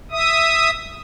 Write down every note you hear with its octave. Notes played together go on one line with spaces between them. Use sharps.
E5 D#6